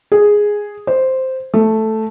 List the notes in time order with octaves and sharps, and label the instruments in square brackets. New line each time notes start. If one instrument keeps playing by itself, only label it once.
[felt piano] G#4
C5
A3